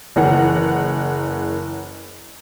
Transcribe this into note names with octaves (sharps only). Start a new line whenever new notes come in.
F#1 E3 A#4 F#5